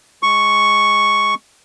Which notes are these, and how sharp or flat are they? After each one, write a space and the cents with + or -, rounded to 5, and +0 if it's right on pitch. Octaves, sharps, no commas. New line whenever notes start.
G#3 +0 C#6 +0